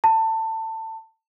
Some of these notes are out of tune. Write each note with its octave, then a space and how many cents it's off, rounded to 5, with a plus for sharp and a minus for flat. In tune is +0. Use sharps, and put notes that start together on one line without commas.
A5 +25